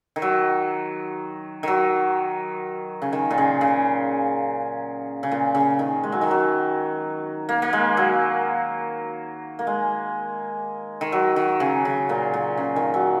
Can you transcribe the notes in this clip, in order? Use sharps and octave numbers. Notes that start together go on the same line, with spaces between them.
D#3
F#3
D#3 F#3
C#3
D#3
A#2
C#3
C#3
C#3
A#2
C#3
D#3
G#3
F#3
D#3
F#3
A#3
A#3
G#3
F#3
A#3
G#3
D#3
F#3
D#3
C#3
C#3
A#2
A#2
C#3
D#3
F#3